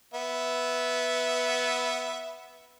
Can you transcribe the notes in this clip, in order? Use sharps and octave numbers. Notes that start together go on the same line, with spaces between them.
B3 E5